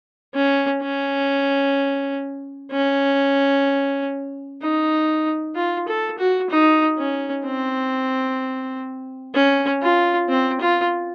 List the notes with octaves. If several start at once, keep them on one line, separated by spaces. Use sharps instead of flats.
C#4
C#4
C#4
D#4
F4
A4
F#4
D#4
C#4
C4
C#4
F4
C4
F4